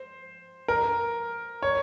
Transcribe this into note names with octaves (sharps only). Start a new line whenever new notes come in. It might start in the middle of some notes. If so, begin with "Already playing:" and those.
Already playing: C5
A#4
C#5